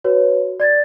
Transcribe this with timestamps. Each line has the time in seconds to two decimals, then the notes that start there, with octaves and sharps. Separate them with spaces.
0.04 F#4 B4 C#5
0.60 D5 G#6 A6